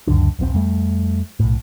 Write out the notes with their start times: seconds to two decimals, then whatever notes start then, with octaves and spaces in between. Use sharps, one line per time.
0.07 C#2 F#2 D3 D4
0.39 D#1 A#1 C3 C4
0.53 F2 G3 A3
1.40 B1 A2